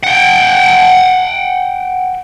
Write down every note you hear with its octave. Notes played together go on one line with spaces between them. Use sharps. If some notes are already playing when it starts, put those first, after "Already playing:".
F#5 G5